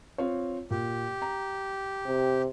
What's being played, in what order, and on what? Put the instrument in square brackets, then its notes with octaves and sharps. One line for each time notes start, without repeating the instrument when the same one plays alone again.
[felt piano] C4 F4 C#5
[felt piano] A#2 [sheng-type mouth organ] G4
[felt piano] A#5
[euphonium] C3